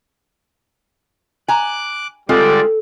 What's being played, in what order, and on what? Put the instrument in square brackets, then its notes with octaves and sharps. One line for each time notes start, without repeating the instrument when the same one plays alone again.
[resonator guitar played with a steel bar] G#5 A#5 [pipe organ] D6 F#6
[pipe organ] D3 G3 D5 [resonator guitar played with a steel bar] G#3 C4 F4 [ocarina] A4